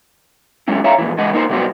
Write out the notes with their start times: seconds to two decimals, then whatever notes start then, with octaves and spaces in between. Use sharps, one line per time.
0.68 F#3 G#3 C#4 E4
0.84 C#5 E5 F5 A#5
0.98 F2 A#2 E3
1.18 C#3 E3 G#3 D#5 F#5
1.33 A#3 D#4 C5
1.49 C3 F#3 G3 B3 F#4 C5